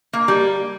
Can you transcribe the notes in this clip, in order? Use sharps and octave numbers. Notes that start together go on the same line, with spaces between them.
A#3
G3